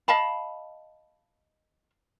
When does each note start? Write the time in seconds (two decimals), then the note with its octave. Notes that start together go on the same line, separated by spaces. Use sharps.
0.08 D#5 F5 A5 B5